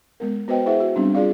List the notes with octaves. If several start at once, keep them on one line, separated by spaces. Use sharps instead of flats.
G#3 B3 A#4
B3 F#4 B4 C5 D#5 G5
E4 G#4 C5 E5 F#5
F#4 E5
G3 B3 C4 D4 D#4
F4 G#4 D5 F5